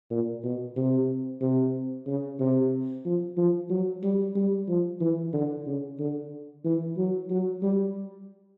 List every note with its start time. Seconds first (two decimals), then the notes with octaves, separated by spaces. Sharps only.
0.11 A#2
0.43 B2
0.76 C3
1.41 C3
2.07 C#3
2.40 C3
3.05 F3
3.37 F3
3.70 F#3
4.03 G3
4.35 G3
4.68 F3
5.01 E3
5.33 D3
5.67 C#3
5.99 D3
6.65 E3
6.97 F#3
7.30 F#3
7.63 G3